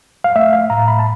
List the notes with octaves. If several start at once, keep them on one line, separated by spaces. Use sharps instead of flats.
F5
A3 E5
F5
A2 A#5
B5
A5